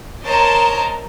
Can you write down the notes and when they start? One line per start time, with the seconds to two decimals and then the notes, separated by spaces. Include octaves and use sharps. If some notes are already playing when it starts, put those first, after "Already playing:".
0.25 A#4 C5 C#5 D#5 A5 A#5